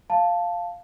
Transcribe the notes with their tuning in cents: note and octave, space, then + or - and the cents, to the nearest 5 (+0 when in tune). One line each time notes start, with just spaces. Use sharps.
F5 +0 A5 +0